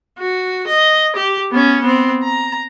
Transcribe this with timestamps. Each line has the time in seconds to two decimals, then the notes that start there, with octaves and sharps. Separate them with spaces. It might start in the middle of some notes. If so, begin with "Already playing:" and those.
0.18 F#4
0.67 D#5
1.16 G4
1.51 B3 C#4
1.82 B3 C4
2.24 A#5